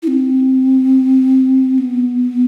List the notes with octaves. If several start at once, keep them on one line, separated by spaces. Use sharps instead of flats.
E4
C4
B3